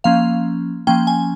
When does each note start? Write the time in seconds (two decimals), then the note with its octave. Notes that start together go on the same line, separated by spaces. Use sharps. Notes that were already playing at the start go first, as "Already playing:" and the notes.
0.04 F3 A#3 C#4 F5
0.87 F3 A#3 C#4 G5
1.07 G#5